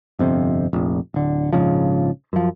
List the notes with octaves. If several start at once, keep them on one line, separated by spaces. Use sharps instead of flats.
G1 F2 C3
F1 A#1
D1 D3
A#1 G#2 C#3 F3
F#2 F3